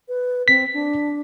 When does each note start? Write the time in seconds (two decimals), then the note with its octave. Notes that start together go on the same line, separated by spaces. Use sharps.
0.08 B4
0.48 C4 B6
0.74 D4